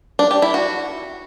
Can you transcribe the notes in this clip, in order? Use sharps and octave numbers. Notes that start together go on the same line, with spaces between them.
D4
G4
E4
F#4